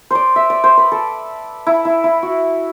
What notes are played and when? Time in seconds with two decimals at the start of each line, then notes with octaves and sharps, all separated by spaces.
0.11 C5 D5
0.36 E5
0.50 D5
0.64 C5
0.77 B4
0.92 A4
1.67 E4
1.85 E4
2.04 E4
2.23 F#4